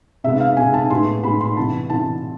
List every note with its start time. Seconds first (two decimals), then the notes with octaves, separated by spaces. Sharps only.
0.24 C3 G#3 B3 E5
0.40 F5
0.57 C3 G#3 B3 G#5
0.74 A5
0.90 A2 G#3 B3 C6
1.23 A2 G#3 B3 B5
1.41 C6
1.57 C3 E3 B3 A5
1.90 C3 E3 B3 A5